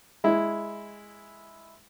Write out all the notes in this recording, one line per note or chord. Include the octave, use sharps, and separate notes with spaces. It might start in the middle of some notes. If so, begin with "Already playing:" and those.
G#3 E4